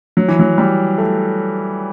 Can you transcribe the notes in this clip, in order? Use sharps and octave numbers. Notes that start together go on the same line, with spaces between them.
F#3
E3
F#3
G3
A3